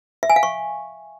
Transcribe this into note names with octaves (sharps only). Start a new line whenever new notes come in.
E5
G#5
F5
C#6